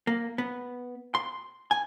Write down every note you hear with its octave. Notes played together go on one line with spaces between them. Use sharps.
A#3
B3
C6
G#5